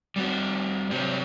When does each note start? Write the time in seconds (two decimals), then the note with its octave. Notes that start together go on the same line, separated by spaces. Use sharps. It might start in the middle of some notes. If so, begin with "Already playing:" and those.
0.16 G3 C4 F#4
0.91 C3 F#3 C4 G4